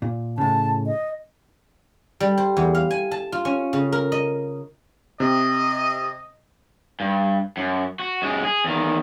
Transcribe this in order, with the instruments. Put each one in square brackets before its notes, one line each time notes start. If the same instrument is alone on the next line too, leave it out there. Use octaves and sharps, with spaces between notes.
[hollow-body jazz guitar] A#2
[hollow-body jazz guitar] A2 C#3 [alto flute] A5
[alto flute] D#5
[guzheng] G3
C5
E2
F5
G#5
A5
F4
C#4
C#3
A#4
D#5
[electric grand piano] C3 [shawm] D#5
[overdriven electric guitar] G2
F#2
F#4
F#2 G#3
G#4
E2 D#3